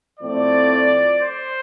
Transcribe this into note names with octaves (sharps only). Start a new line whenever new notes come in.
A2 F3 A3 C4 D5
C5